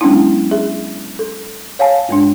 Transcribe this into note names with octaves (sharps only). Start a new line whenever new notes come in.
F#3 G#3 B3 C#4 D4 E4
G#4 E5
A4
C#5 F5 G#5 A5
G2 G#3 D4